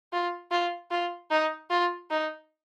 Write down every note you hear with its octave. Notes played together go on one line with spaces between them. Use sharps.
F4
F4
F4
D#4
F4
D#4